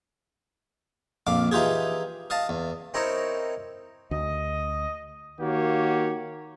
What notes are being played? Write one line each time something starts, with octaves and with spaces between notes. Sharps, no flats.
A#1 F2 F5 D6
E3 D#4 F4 G4 G#4
D#5 F5 A5
E2
C4 D#4 E4 A#4 C#5
D2 D#5
D#3 A#3 F#4 G4 C#5